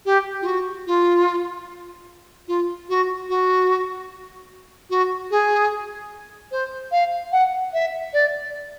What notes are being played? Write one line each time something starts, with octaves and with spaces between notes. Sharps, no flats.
G4
F4
F#4
F4
F4
F#4
F#4
F#4
G#4
C5
F5
F#5
E5
D5